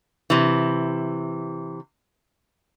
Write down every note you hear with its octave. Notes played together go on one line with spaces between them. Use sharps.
C3 E3